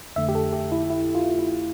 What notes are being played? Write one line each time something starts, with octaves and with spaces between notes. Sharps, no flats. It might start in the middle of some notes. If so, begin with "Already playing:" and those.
F2 D3 A3 E5
G4
A4
G4
E4
E4
F4
E4